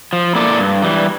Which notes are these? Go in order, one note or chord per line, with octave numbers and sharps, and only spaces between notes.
F3
A#3 E4 A4 D5
G2
E3 G3